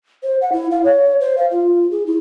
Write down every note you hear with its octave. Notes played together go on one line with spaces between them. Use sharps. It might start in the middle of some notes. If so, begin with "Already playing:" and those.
C5
F#5
E4
F5
C#5
C5
F5
F4
G#4
E4